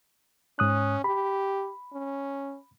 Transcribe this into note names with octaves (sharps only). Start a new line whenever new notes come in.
G#2 C#4 D#6 F#6
G4 B5
C#4